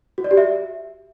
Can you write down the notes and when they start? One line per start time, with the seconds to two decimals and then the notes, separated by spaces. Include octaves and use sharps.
0.18 F#4
0.24 D5
0.31 G4
0.37 E5